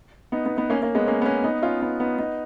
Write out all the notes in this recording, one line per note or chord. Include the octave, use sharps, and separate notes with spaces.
B3 D#4
B3 D#4
B3 D#4
A#3 C#4
A#3 C#4
G#3 B3
A#3 C#4
B3
A#3 C#4
B3 D#4
C#4 F4
B3 D#4
B3 D#4
B3 D#4